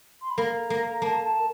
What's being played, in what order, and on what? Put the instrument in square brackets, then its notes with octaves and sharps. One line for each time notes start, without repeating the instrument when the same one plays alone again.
[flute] C6
B5
[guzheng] A#3 [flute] A#5
[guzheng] A#3
[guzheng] A#3 [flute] A5
[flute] A5